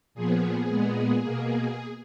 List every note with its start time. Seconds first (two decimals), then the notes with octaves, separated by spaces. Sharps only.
0.15 A#2 F3 B3 G#4
0.69 A#2 G#3 B3
1.22 B2 A#3